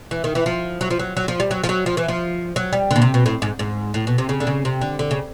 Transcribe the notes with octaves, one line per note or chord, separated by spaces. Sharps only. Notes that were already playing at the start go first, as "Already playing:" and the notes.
E3
D#3
E3
F3
F#3
F3
F#3
F#3
F3
G3
F#3
F3
F#3
F3
E3
F3
F#3
G3
D3
B2
C3
B2
A2
G#2
G#2
A2
B2
C3
C#3
D3
C#3
C3
D3
D3
C#3